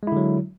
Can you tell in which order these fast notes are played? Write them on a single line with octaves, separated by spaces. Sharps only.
G#3 E4 D3 F#3